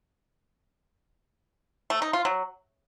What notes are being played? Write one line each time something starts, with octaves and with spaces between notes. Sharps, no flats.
A3
D#4
F4
F#3